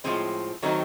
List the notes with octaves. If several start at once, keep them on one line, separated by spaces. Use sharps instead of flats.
A2 F3 G#3 C4
D#3 F#3 A3 C4 D#4